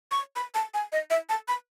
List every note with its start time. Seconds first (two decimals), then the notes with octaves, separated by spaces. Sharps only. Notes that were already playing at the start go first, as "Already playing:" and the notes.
0.11 C#6
0.36 B5
0.55 A5
0.74 G#5
0.92 D#5
1.10 E5
1.29 A5
1.48 B5